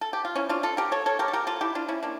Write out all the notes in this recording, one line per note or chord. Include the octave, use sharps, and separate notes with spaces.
A4
G4
F4
C#4 E4
D4 F4
F4 A4
G4 A#4
A4 C#5
A4 C#5
G4 A#4
A4
G4 A#4
F4 A4
E4 G4
D4 F4
C#4 E4
A#3 D4